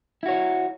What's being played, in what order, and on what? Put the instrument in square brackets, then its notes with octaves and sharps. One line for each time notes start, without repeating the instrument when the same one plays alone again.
[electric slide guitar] E4
F#4
C#5